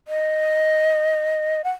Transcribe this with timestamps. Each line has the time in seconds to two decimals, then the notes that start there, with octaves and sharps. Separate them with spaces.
0.08 D#5
1.64 F#5